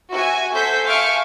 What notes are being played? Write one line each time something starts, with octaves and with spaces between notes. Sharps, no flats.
F#4 E5 G#5
A4 C5 G6 B6
E5 F5 G#5 C#6 F6 D7